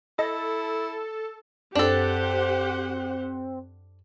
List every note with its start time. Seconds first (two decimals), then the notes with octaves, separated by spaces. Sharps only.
0.19 E4 A4 D#5 A#6
1.75 F#2 C4 D4 G4 A4 C5 F#5